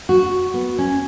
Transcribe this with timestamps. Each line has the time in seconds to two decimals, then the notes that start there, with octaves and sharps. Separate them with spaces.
0.09 F#4
0.54 B3
0.78 C#4